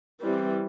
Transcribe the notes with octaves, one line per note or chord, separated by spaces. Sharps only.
E3 G3 C4